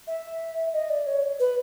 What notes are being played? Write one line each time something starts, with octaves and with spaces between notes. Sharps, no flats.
E5
D#5
D5
C#5
B4